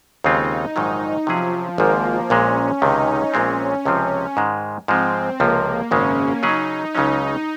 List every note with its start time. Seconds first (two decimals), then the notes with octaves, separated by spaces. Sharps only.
0.24 D#2 C#3 G#3 C4 D#4 F4
0.76 A#1 G#2 D#3 F#3 D#4
1.27 C3 F3 F#3 C#4 G#4
1.78 G#1 G#2 F3 A#3
2.30 A#1 A#2 G#3 C#4
2.82 C#2 C3 D#3 D#4
3.34 A#1 A#2 G#3 C4 C#4
3.85 C#2 C3 F3 C4
4.37 G#2 D#3 G#3
4.88 G#2 F3 G#3 C4
5.39 C#2 C3 F3 A#3
5.91 G#1 F#2 C#3 G#3 C#4
6.43 C#3 F#3 C#4 D#4 G#4
6.95 C#2 C#3 F#3 C#4 D#4